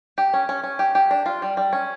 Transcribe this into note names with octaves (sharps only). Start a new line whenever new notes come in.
G4
C#4
C#4
C#4
G4
G4
D4
F4
G3
G3
C#4